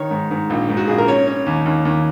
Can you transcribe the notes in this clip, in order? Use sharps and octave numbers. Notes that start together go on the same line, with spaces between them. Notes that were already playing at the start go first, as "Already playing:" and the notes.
Already playing: D#3 C#5
G#2
G#2
A#1
G#2
F#4
A#1 G#4
A#4
C#4 C#5
C#4
D#2
D#2
D#2